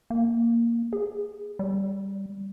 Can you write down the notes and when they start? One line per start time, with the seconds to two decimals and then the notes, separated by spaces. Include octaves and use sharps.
0.10 A#3
0.93 G#4
1.59 G3